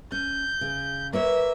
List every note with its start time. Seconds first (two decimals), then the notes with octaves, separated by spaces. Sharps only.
0.12 C#4 G6
0.61 C#3
1.13 A#3 B4 C#5 E5